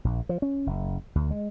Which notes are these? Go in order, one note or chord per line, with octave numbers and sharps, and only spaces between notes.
A#1
F3
C#4
F#1
D2
G#3